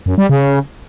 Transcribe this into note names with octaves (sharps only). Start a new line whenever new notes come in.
F#2
G3
C#3